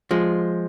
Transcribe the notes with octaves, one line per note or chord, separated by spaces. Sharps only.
F3 G#3